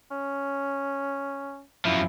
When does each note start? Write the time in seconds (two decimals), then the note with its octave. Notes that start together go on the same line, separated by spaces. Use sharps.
0.11 C#4
1.85 F#2 F3 E4